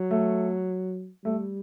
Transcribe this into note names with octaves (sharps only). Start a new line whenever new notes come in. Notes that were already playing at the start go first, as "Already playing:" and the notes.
Already playing: F#3
A3
G3 A3